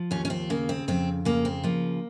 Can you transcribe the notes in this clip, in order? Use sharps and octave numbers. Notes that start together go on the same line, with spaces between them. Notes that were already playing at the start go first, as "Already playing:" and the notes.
Already playing: F3
D#2 C#4
C#4
C4
C#3 A#3
C4
F2 C4
C#3 A#3
C4
F3 A#3